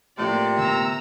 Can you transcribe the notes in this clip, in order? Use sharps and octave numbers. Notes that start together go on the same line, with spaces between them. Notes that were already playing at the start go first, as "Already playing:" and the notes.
A2 C3 F3 A#3 D5
D3 B3 A#5 E6